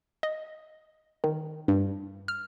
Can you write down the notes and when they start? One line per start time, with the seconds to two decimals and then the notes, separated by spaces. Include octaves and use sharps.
0.23 D#5
1.24 D#3
1.68 G2
2.28 F6